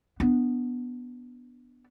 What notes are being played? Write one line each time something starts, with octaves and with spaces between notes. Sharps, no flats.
B3 D4